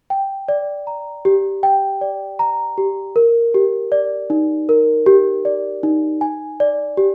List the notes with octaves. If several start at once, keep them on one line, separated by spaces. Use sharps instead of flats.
G5
D5
A#5
G4
G5
D5
A#5
G4
A#4
G4
D5
D#4
A#4
G4
D5
D#4
G#5
D5
G4